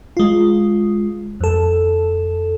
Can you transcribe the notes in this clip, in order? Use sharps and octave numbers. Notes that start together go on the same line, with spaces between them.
G#3 F4
F2 A4